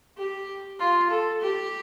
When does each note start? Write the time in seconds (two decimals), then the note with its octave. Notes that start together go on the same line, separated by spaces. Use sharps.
0.18 G4
0.79 F4
1.10 A4
1.41 G4